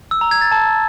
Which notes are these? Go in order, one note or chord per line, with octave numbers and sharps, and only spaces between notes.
E6
A#5
G#6
A6
A5